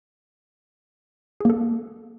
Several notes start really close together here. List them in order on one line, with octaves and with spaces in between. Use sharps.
G#4 A#3 A4